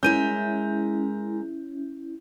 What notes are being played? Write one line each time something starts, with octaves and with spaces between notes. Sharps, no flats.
G#3 C#4 E4 A#4 E5 G6 D#7